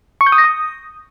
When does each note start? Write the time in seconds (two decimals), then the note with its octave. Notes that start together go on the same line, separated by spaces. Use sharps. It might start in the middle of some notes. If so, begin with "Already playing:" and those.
0.21 C#6
0.27 G6
0.32 D#6
0.38 A#6
0.44 D#6